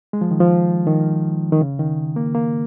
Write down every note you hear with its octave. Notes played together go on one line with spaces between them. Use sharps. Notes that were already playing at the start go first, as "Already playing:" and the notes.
G#3
F3
D#3
F3
D#3
D#3
C#3
D#3
A#3
A#3